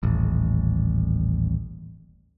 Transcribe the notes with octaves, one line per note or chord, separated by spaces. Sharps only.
D#1 A1